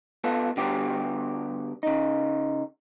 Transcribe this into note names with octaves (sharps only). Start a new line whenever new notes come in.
B3 F4 A4
D3 G3 B3 F#4 G4
C#3 D#4